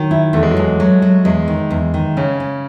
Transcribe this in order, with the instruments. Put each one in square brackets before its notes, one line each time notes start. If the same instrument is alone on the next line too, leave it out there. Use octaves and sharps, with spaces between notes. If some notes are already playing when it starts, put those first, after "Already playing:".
Already playing: [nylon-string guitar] D#3 [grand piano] F#3
[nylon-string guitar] E4
[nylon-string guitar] E2 [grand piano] A3
[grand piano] G#3
F#3
[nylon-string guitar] E2 [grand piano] G#3
[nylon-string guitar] F#3
F#3
[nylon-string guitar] E2 [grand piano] G#3
[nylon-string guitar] D#3
E2
D#3
[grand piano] C#3 [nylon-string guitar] C#4
[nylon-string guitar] C#4